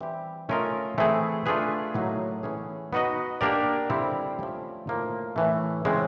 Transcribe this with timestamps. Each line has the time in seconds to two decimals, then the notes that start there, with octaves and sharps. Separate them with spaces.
0.01 E3 G3 C4 E4 G4
0.49 A3 C#4 F4 A#4 D#5
0.98 E3 A3 C4 E4 G#4
1.46 A3 D4 F4 G#4 B4
1.94 A2 F#3 A#3 D#4
2.43 E3 A3 C#4 E4 G#4
2.93 B3 D#4 F#4 B4 D#5
3.41 A#3 D4 G4 A#4 D5
3.90 D3 G3 C4 E4
4.39 F3 A3 C#4
4.87 A2 F3 A#3 D#4
5.36 A2 E3 A3
5.85 C#3 E3 G#3 C4